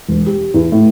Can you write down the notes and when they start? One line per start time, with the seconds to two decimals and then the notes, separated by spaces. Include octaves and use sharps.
0.09 E1
0.26 G4
0.54 E2
0.72 A2